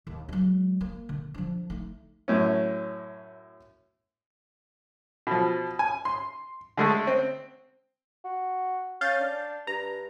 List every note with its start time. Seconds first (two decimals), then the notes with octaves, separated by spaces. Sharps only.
0.07 D#2
0.29 F#3 G#3
0.81 A#3
1.09 D3
1.34 F3 D4
1.70 A3 D#4
2.28 F#2 A2 C#4
5.27 B2 F3
5.79 G#5
6.05 C6
6.77 D3 G#3 A3
7.07 C4
8.24 F#4
9.01 C#4 F5 G6 A6
9.20 D4
9.67 G2 A#5